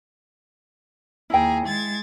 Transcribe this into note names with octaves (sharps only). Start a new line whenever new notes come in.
D#2 E4 G#4 G5 A#5
G#3 G#6 A6